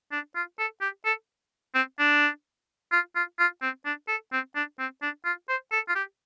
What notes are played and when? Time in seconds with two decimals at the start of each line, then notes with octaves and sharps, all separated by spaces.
0.12 D4
0.35 F4
0.59 A4
0.81 G4
1.05 A4
1.75 C4
1.99 D4
2.92 F4
3.16 F4
3.39 F4
3.62 C4
3.85 D4
4.08 A4
4.32 C4
4.56 D4
4.79 C4
5.02 D4
5.25 F4
5.49 C5
5.72 A4
5.89 F4
5.95 G4